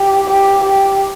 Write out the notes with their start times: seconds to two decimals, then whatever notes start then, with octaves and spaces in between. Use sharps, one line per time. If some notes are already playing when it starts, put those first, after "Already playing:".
Already playing: G4
0.30 G4
0.64 G4